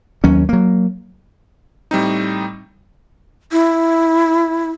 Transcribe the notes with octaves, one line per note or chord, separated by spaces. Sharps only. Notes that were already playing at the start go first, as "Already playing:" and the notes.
D#2 F#3 C#4
F#3 A#3
A2 G3 C4 D#4
E4